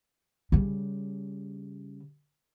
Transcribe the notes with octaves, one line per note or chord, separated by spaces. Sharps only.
C#3 G3